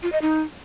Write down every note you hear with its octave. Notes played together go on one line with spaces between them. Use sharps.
F4
D#5
D#4